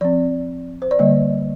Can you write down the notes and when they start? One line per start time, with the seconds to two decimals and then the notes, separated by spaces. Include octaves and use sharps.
0.01 F3 C4 D5
0.82 C5
0.91 D5
0.99 D3 G3 A#3 D#5